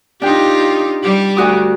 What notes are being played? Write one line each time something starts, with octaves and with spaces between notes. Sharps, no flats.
D4 D#4 F4 G4 G5
G3 G4
D2 F#4 D#6